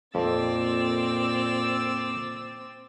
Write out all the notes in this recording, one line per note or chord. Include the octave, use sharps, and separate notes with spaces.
F2 A#2 C4 D6 E6 A6